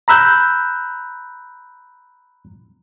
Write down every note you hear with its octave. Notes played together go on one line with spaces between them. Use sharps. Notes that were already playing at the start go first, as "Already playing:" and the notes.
A#5 B5 E6 F#6 G6